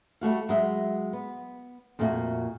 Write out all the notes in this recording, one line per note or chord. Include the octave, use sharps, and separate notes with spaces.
G3 A3 F#4 F5
F#3 G#3 E5
B3
F2 A#2 A3 A#3 F#4 D#5